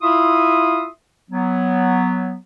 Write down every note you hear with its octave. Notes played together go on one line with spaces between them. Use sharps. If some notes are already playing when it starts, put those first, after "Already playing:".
E4 F4 E5 C6 D#6
F#3 B3